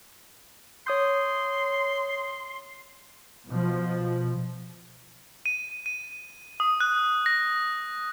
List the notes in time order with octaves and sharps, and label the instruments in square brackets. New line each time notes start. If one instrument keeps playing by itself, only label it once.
[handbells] C#5 D#6 G6 [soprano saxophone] C6
[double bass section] B2 F3
[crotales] D#7
D#7
D#6
F#6
A#6